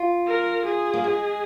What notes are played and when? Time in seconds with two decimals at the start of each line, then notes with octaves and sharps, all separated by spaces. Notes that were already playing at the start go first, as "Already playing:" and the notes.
Already playing: F4
0.27 A#4
0.65 G#4
0.94 A#3
1.04 G#3